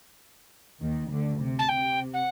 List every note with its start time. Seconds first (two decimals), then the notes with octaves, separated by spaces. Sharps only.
0.81 D#2 D#3
1.10 D2 D3
1.39 C3
1.59 A5
1.69 C3 G5
2.13 F#5